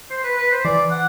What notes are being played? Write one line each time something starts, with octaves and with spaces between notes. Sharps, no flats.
C5
B4
B4
C5
E3 D5
F#5